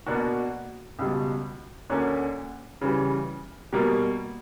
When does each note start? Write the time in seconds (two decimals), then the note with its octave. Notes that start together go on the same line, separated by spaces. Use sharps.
0.06 B2 A#3 D4 F#4
0.99 C#2 B2 G3
1.90 D2 D3 A#3 C#4
2.81 C#3 E3 G3
3.72 B2 G3 A#3